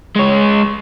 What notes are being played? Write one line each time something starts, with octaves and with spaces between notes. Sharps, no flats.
G#3 C#5